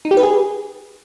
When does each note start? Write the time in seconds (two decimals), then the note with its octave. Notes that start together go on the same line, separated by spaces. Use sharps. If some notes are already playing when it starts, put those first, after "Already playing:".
0.05 D#4
0.11 G4
0.17 B4
0.23 G#4